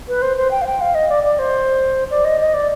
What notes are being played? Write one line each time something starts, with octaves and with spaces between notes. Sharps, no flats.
B4
C5
C5
G5
F5
G5
F5
D#5
D5
D5
C5
D5
D#5
D#5
D5